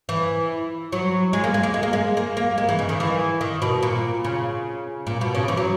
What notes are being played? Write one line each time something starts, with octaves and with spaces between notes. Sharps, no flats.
E3
F#3
G#3
A#3
G#3
A#3
G#3
A#3
G#3
A#3
A#3
G#3
E3
C#3
D#3
E3
D#3
B2
A#2
C#3
A#2
B2
C#3
E3
F#3